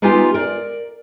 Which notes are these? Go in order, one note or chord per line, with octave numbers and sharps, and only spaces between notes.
G#3 B3 D#4 F4 G4 G#5
A#4 D5